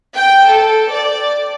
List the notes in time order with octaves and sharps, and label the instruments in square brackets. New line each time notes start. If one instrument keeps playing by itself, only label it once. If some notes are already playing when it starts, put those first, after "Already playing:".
[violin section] G5
A4
D5